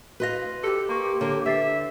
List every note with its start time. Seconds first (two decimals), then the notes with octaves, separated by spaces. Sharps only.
0.20 F#4 B4 D#5 F5 C6 A#6
0.63 G4 A4
0.89 A#3 C6 C#6
1.21 D3 A#3 C#5
1.46 D3 B4 E5 A6 C7